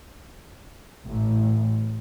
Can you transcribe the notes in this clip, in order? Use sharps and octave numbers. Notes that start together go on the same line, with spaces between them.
A1 A2